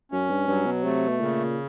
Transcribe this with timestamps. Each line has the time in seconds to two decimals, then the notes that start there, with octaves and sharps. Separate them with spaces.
0.12 F#2 C#4
0.30 G2
0.48 G2 F#3
0.66 B2
0.84 C3 A3
1.09 B2
1.20 A#2 C#3